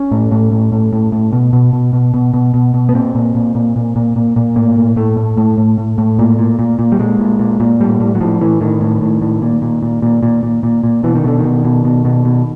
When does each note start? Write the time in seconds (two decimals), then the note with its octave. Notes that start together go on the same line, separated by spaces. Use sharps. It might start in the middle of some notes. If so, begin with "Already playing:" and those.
Already playing: C#4
0.12 A2
0.32 A2
0.52 A2
0.72 A2
0.93 A2
1.12 A2
1.33 B2
1.53 B2
1.73 B2
1.93 B2
2.14 B2
2.34 B2
2.54 B2
2.74 B2
2.89 B3
2.94 A#2 C4
3.15 A#2
3.35 A#2
3.55 A#2
3.76 A#2
3.96 A#2
4.16 A#2
4.36 A#2
4.56 A2 A#3
4.77 A2
4.96 A2 A3
5.17 A2
5.37 A2
5.58 A2
5.78 A2
5.98 A2
6.19 A#2
6.39 A#2
6.59 A#2
6.79 A#2
6.92 G3
6.99 A#2 G#3
7.19 A#2
7.39 A#2
7.60 A#2
7.80 A2 G3
8.00 A2 G3
8.15 F#3
8.20 A2 F3
8.41 A2 E3
8.61 A2 D#3
8.81 A2
9.01 A2
9.22 A2
9.42 A#2
9.62 A#2
9.83 A#2
10.02 A#2
10.23 A#2
10.43 A#2
10.63 A#2
10.84 A#2
11.03 B2 E3
11.15 D#3
11.24 B2 D3
11.39 D#3
11.44 B2
11.65 B2
11.85 B2
12.05 B2
12.25 B2